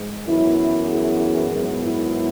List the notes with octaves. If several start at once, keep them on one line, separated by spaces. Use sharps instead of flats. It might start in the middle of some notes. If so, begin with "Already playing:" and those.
Already playing: G#2 G#3
F#2 E3 B3 E4
G#4
G#4
G#2 D#3 F#3 B3
E4